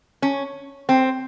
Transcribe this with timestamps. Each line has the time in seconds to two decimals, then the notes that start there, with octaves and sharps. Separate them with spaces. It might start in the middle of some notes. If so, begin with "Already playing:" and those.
0.22 C#4
0.89 C4